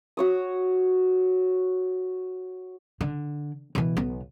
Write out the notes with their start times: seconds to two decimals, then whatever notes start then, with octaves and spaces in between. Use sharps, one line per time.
0.17 F#4 C#5 D#6
3.01 D3
3.75 B2 E3
3.97 B1 B3